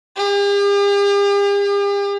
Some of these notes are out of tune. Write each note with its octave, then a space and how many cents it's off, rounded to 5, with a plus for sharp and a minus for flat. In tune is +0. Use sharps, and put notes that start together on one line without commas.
G4 +45